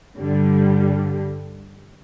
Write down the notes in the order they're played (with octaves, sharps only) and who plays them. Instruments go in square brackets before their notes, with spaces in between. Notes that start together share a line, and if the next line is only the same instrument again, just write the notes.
[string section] G2 D3 G3